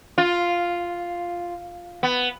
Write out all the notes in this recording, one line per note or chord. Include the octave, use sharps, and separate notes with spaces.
F4
B3